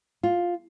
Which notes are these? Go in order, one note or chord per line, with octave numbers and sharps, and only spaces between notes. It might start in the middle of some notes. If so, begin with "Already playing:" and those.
F4